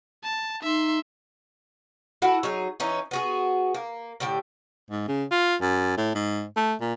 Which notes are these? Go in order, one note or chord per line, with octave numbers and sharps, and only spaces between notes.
A5
D#4 E5 C6
E4 F#4 A4 F#5
F#3 D#4 G#4
E3 C#4 D#4
B3 F#4 G#4
A#3
A2 D3 G4 G5
G#2
C#3
F4
F#2
A2
G#2
A3
A#2